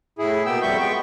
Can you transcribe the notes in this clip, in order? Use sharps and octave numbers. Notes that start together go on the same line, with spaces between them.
A2 E4 G#4
B2 A#3 B3 G5 E6
F2 G3 E5 C#6 G6
G#3 B3 G5 C#6